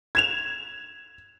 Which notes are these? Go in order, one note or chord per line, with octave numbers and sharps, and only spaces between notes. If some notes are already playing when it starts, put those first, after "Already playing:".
G#6 E7 F7